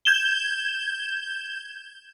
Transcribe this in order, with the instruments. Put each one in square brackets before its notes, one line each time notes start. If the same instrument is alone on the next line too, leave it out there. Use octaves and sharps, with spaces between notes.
[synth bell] G6 G#6 E7 G7